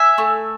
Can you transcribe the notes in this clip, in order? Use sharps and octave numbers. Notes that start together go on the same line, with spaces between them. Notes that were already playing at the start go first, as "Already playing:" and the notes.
Already playing: E5 G#5
A3